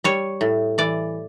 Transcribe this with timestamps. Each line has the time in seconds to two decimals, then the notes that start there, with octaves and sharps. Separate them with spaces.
0.04 G3 C#5
0.41 A2
0.78 E3 D5